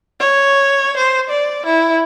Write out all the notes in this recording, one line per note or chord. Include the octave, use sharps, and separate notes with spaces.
C#5
C5
D5
E4